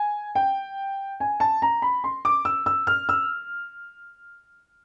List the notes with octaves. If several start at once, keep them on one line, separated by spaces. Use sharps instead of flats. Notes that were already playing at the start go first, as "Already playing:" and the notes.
Already playing: G#5
G5
G#5
A5
A#5
B5
C6
D6
E6
E6
F6
E6